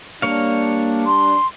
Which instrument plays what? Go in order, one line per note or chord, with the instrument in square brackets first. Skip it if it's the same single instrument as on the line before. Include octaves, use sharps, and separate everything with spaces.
[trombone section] G3 D4 [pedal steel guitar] A#3 C#5 F5
[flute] C6